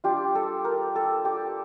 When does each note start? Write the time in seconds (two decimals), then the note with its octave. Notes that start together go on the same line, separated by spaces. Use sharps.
0.04 G3 D4 F4 G4
0.35 A4
0.64 A#4
0.95 A4
1.25 G4